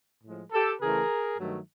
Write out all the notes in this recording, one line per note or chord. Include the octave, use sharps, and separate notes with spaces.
A2 F3 G#3
G4 A4
C#3 E3 A3 G#4 A#4
G2 D#3 F#3 A3